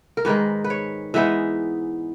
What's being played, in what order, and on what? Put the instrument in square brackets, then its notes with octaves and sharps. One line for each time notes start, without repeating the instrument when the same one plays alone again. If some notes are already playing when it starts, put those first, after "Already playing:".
[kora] A#4
G#2 D#3 G#3 B4
B4
C#5
E3 G#3 B3 D#4 E5